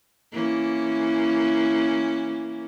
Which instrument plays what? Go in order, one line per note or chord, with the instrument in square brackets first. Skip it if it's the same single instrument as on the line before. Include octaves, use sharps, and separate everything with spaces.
[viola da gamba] E3 A#3 C#4